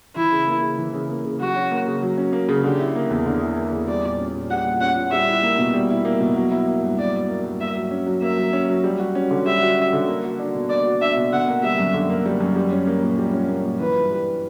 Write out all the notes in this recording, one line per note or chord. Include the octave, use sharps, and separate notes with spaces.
E3 E4
C#3
A#3
C#3
E3
C#3
A#3
C#3
F#3 F#4
C#4
A#3
C#3
F#3
C#4
A#3
C#3
D3 G4
E4
A#3
E2
D3
E4
A#3
E2
G3 D5
A#2
C#4
A#2
G3 F#5
A#2
C#4 F#5
A#2
G3 E5
E4
A#3
B2
G3
E4
A#3
B2
F#3
E4
A#3
G2
F#3 D5
E4
A#3
G2
A#3 E5
F#3
C#4
F#3
A#3 E5
F#3
C#4
F#3
G3
F#4
C#4
D3
G3 E5
F#4
C#4
D3
A#3
F#4
D4
B2
A#3 D5
F#4
D4 E5
B2
D3 F#5
A#3
G3 E5
F#2
D3
A#3
G3
F#2
G3
C#4
A#3
A#2
G3
C#4
A#3
A#2
E3 B4
G2
G3